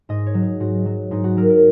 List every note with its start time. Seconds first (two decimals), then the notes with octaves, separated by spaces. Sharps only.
0.09 G#2 D#5
0.26 C#5
0.34 F#3
0.43 G#4
0.60 G#2 F#4
0.86 F#3
1.11 G#2 D#4
1.24 F#4
1.37 F#3 A#4
1.50 A#4